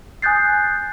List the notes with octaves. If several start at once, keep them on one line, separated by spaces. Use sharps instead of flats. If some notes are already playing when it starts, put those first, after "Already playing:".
G#5 D#6 F#6 G6 A6 C7